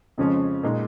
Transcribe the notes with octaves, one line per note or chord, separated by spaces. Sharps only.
F2 C#3 F3 G#3 C#4
A#2 G#3 D#4